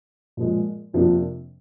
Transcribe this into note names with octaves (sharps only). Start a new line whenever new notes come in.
A#2 F3 G#3
F2 C3 F3 A#3 D4